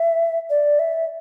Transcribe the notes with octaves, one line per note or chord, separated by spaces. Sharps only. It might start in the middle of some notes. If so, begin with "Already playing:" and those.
Already playing: E5
D5
E5